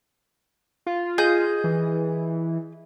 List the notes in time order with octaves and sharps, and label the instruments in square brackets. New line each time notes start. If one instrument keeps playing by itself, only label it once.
[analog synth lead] F4
[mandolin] G#4 D#5 G6
[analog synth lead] E3